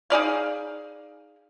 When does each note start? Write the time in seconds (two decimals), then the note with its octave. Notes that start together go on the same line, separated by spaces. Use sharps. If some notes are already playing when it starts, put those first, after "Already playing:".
0.10 D#4 G#4 D5 F5